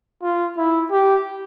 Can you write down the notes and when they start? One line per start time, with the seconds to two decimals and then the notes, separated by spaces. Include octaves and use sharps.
0.23 F4
0.57 E4
0.91 G4